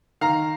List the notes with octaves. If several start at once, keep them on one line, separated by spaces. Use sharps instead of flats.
D#3 F5 A#5